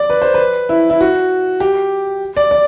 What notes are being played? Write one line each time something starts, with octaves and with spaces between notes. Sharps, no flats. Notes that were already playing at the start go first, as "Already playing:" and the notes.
Already playing: D5
B4
C5
B4
E4
E4
F#4
G4
D5
D5